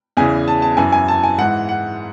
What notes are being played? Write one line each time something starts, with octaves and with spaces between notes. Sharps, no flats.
E2 C#3 E3 G#5
A5
A5
F#2 E3 G#5
G#5
A5
G#5
G#2 E3 F#5
F#5